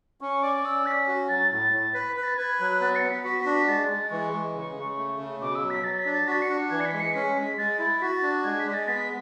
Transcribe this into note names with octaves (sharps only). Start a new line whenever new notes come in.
C#4 C#6
D5 D6
C#4 E6
C#4 B6
F#4
F#3 A6
A2 A6
A2
B4 B6
B6
B4
A6
B4 G#6
F#3 F#6
B3 A6
C#7
B3
B6
F#4 B6
B6
D4
B6
G#3 A6
G#3
E3 C#6
G#3
C#3
C#3
A3
C#3
B2 D6
E6
F#3
B6
F#3 A6
B6
D4
A6
F#4 B6
C#7
D4
E3 G#6
C#7
B6
G#3
C#7
C#4 B6
G#3
G#3 A6
E4
F#4 B6
A6
D4
G#3 G#6
B6
G#3
A6
B3 B6